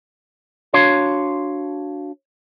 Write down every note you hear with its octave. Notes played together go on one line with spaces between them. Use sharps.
D4 F#4 C#5 F5 C6